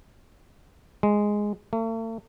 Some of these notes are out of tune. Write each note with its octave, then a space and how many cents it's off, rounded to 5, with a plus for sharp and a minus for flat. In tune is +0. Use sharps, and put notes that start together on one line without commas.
G#3 -5
A3 +45